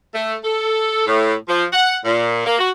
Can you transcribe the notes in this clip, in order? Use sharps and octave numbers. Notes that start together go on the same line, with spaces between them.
A3
A4
A2
F3
F#5
A#2
A#3
F#4